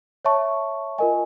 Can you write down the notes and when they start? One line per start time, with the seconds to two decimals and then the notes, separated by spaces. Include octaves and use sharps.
0.25 C#5 E5 A5 C#6
0.98 F4 A#4 D#5 G#5